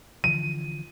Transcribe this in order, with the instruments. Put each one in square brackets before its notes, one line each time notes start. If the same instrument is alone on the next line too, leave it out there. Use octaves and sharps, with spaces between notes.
[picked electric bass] D3 E3 F3 [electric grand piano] D#7